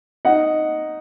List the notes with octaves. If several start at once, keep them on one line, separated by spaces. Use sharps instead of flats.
D#4 F#5